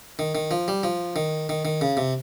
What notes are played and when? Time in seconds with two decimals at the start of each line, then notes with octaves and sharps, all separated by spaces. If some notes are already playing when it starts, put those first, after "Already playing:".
0.19 D#3
0.35 D#3
0.51 F3
0.68 G3
0.83 F3
1.16 D#3
1.49 D#3
1.65 D#3
1.81 C#3
1.97 C3